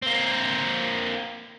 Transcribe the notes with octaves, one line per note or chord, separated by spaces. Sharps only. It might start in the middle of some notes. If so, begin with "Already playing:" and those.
A#3 C4